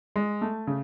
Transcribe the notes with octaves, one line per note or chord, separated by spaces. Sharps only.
G#3
A3
C#3